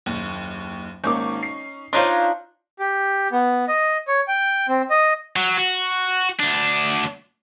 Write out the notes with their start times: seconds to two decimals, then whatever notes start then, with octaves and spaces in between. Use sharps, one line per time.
0.06 F#1 D#2
1.04 G#1 A#3 C#4 D#4 C#6 D6 G6
1.43 C7
1.93 D4 D#4 F4 C5 C#5 D#5 C6
2.79 G4
3.32 B3
3.68 D#5
4.08 C#5
4.28 G5
4.68 C4
4.90 D#5
5.36 F#3
5.58 F#4
6.40 D2 D4